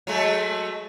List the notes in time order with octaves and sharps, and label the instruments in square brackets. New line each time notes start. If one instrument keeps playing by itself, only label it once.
[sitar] F#3 G#3 A3